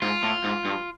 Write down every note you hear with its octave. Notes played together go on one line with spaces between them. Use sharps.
G#2 F4
A2
G#2
G2